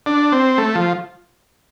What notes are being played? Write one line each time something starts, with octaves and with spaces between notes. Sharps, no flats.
D4
C4
A3
F3